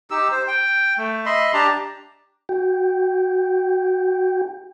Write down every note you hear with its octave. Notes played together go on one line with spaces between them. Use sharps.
D#4 G4 E6
C5
G5
A3
D#5 E5 B5 C6
D4 G4 A5 A#5
F#4 G5